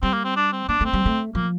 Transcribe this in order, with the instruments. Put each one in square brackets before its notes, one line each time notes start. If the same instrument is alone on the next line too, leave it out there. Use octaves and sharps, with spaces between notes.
[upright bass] G3 [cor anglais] C4
[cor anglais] A#3
C4
D4
C4
[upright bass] A#3 [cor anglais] D4
[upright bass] A3 [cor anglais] C4
[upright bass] G3
A3
[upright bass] F3 [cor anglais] A#3